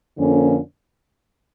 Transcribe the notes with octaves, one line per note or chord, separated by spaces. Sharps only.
F2 D3 F3 A#3 C#4